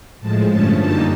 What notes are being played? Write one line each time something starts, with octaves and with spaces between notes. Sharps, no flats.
A2 F3 G#3 A5
G2 D3 F3 A3 C#4 A5
F#2 D3 G3 A#3 D#4 A5